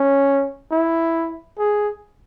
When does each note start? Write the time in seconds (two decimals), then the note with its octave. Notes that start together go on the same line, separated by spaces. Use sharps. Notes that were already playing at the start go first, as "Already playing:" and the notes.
Already playing: C#4
0.71 E4
1.59 G#4